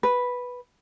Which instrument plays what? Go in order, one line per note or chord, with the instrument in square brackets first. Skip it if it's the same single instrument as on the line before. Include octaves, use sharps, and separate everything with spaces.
[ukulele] B4